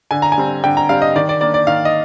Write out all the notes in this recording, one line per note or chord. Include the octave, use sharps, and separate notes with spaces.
D3 G#5
A#5
G#5
G3 C4
D3 G5
A#5
G3 C4 F5
D#5
D#3 D5
D5
A#3 D4 D5
D5
D#3 F5
D#5